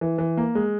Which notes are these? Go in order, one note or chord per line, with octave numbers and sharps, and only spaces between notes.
E3
E3
A#3
G#3